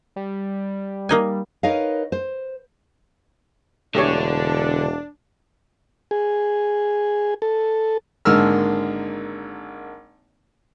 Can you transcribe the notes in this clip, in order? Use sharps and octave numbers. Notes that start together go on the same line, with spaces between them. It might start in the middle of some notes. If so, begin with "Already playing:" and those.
G3
A#3 D#4 G#5
D#4 A#4 B4 C#5 D#5 F5
C5
E1 D3 A3 D4 G4 C#5
G#4
A4
G#1 D3 G#3 A#3 E6 F6